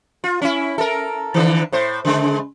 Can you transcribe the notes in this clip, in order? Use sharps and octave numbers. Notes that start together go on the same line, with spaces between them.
F4
C#4 E4
A4 A#4
D3 D#3
A2 C5
C#3 G#3